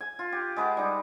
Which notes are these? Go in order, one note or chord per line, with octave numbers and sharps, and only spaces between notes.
G#5
F4
G4
G#3 B4 F#5 D6
G3 D#4